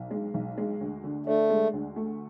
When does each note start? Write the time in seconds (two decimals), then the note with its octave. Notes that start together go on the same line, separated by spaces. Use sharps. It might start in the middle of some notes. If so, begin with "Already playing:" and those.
Already playing: B1
0.11 G#3
0.34 B1
0.58 G#3
0.81 D2
1.04 D3
1.26 A3 D4
1.50 G#3
1.73 D2
1.96 A3